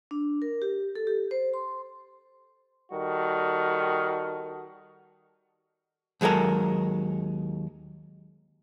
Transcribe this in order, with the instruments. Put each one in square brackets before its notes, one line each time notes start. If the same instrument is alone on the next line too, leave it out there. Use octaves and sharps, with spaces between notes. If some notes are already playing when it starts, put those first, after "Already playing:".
[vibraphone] D4
A#4
G4
A4
G4
C5
C6
[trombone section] D#3 G3 F#4 A4
[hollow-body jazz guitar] D#2 F#3 G#3 A4 A#4